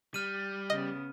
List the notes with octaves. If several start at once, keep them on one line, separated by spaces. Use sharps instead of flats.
G3 F6 D#7
C#3 B3 D#5